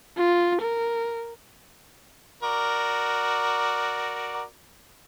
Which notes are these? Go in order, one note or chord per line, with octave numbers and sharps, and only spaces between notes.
F4
A#4
F#4 A#4 D5